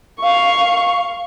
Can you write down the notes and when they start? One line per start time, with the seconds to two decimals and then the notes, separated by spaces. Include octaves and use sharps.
0.20 F5 C#6